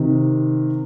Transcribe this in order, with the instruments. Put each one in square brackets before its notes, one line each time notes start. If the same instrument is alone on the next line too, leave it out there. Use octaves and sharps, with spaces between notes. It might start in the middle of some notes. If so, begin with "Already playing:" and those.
Already playing: [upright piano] C3 D#3